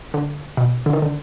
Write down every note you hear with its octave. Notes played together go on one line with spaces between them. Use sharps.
D3
B2
D3
D#3
D3